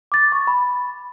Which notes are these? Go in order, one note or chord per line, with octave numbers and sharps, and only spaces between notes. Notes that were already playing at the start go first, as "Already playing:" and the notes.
D6 A6
C#6
B5